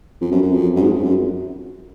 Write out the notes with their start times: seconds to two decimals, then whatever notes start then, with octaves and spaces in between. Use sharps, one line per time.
0.21 F2
0.32 F#2
0.42 F#2
0.53 F2
0.76 F#2
0.83 G#2
0.93 F2
1.03 F#2